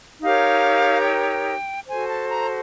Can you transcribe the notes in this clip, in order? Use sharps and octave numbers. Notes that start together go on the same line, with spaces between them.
D#4 G4 A#4 C#5 F5
G5
F#4 A4 C5 G#5
A5
A#5